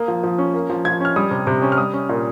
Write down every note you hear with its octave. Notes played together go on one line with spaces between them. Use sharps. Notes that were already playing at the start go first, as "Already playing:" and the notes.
Already playing: A#3 D#6
F3
F3
C#4
A#3
F3
F3 G#6
C#4 F6
G3 D#6
C3
C3
C#4
F6
G3 D#6
C#4
A#2